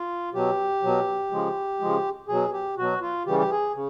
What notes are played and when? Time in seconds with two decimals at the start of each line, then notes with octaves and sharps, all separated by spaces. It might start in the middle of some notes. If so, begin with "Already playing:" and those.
Already playing: F4
0.33 B2 F#3 G4
0.83 B2 F#3
1.31 C#3 F3 G#3
1.80 C#3 F3 G#3
2.28 B2 F#3 G#4
2.53 G4
2.77 B2 F#3 F#4
3.01 F4
3.25 C#3 E3 G3 G4
3.39 G4
3.50 G#4
3.74 C#3